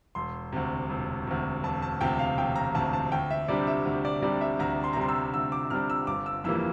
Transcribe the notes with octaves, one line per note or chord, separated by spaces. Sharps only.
E1 C6
D2 C3
E1
D2 C3
E1 A5
A5
D2 C3 G5
F5
E1 G5
A#5
D2 C3 A5
A5
D2 G5
E5
C3 G3 D4 D5
E5
D2
D5
C3 G3 D4 D5
E5
D2 A#5
C6
A#5
C3 G3 D4 C6
E6
D2 E6
D6
C3 G3 D4 F6
E6
G1 D6
E6
F2 E3 G3 A#3 E6